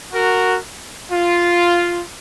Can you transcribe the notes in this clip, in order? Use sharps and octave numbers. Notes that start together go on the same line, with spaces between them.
F#4 A#4
F4